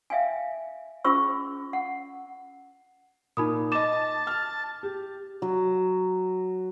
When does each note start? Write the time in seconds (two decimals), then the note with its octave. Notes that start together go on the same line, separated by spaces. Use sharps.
0.10 E5 F5 G5 G#5
1.04 C#4 F4 G#4 C5 C#6 E6
1.73 F#5
3.37 A#2 D#4 B5 D#6
3.72 D#5 A5 D6 E7
4.27 F6
4.83 G4
5.42 F#3